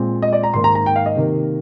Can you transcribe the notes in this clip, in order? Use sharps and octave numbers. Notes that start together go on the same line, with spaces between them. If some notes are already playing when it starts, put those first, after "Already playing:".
Already playing: A#2 G#3 C4
D#5
D5
A#5
G#2 D#3 A#3 C6
A#5
A#5
G5
F5
D#5
C3 D#3 A#3